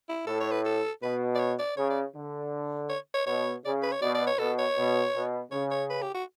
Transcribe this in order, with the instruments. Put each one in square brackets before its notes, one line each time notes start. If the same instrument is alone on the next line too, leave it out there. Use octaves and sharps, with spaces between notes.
[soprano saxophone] E4
[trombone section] A2 [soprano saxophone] A4
[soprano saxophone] C#5
B4
A4
[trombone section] B2 [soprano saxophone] B4
[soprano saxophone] D5
C#5
D5
[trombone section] C#3 [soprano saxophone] C#5
[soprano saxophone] D5
[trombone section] D3
[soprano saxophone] C#5
C#5
[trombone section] B2 [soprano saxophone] C#5
[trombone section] C#3 [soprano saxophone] D5
[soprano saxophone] B4
C#5
[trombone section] B2 [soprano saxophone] D5
[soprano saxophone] D5
C#5
[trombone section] B2 [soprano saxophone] A4
[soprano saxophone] C#5
[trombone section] B2
B2
[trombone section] C#3 [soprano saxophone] C#5
[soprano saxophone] C#5
B4
G4
F#4